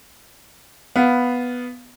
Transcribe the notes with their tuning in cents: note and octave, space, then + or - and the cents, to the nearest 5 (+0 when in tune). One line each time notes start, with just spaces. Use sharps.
B3 +0 F5 +0